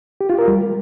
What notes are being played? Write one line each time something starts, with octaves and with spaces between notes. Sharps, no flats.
G4
F4
A#4
G3